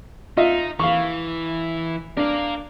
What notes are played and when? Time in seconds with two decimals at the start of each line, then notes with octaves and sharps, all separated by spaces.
0.37 D#4 F4 D#5 E5
0.80 E3 F5 C#6
2.17 D4 A#4 F5